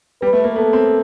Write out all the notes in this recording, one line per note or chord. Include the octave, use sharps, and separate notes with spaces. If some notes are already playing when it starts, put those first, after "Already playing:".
G3 B4
A3
A#3
B3 A4
C4